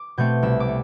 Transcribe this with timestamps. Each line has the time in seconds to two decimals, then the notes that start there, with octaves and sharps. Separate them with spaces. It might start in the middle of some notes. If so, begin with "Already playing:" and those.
Already playing: D6
0.17 B2 A3 C4 G6
0.42 C2 E6
0.60 D6
0.68 A3